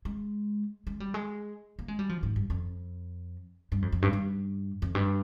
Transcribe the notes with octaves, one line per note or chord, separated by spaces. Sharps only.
G#3
G#3
G3
G#3
A#3
G#3
G3
F3
G#2
G2
F2
G2
F2
F2
G2
G2
F2
G2